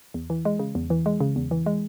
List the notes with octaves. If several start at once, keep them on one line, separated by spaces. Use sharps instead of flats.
E2
E3
G#3
C#3
E2
E3
G#3
C#3
E2
E3
G#3